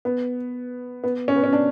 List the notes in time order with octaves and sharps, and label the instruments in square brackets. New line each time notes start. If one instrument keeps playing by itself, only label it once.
[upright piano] B3
B3
C#4
B3
C#4
D4